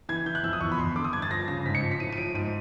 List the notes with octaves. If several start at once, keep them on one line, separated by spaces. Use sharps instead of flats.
E3 G#6
E3 G6
F#6
F2 E6
D#6
E2 C#6
B5
E2 C6
D3 D6
D#6
G2 G#6
A6
F3 A#6
C#3 A#6
G#2 B6
C#7
F3
B6
A2 D#7
D#7
F3 D7
G#2 D#7